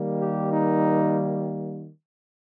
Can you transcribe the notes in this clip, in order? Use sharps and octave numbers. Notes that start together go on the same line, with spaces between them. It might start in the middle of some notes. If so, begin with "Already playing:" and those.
Already playing: D#3 G3 A#3
G4
D#4